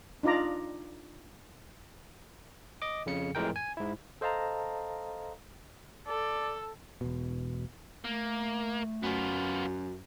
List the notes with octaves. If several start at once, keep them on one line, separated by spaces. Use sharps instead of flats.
D4 D#4 F4 D5 A#5
D#5 D6
F2 C#3 C#7
F2 A2 E3 G#3 A#4 G5
G#5
G#2 E4
A4 C5 D#5 F5 A5 A#5
A4 D5
E1 B2
A3 A#3
F#2 B3 F4